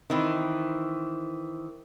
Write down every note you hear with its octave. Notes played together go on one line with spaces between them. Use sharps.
D#3 E3 C4